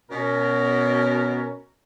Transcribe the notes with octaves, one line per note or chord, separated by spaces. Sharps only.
B2 C#4 A#4